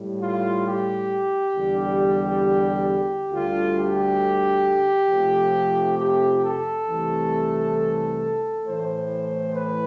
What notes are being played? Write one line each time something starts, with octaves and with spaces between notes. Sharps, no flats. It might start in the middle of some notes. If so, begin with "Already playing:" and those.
Already playing: A2 G3
F4
G4
E2 D3 G3
D2 D3 G3 F4
G4
F2 C3 F3 A3
G4
A4
C2 C3 E3 A3
A2 E3 A3 C5
B4